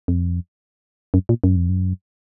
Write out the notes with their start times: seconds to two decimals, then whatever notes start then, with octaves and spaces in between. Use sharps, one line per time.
0.08 F2
1.14 F#2
1.29 A#2
1.44 F#2
1.56 F2
1.69 F#2